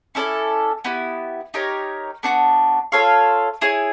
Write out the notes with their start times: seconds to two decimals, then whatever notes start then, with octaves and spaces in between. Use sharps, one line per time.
0.15 C#4 E4 A4 D5
0.85 B3 E4 G4
1.54 D#4 G4 A#4 C#5
2.23 B3 D4 F#4
2.92 F4 A4 C#5 F5
3.61 E4 G#4 C#5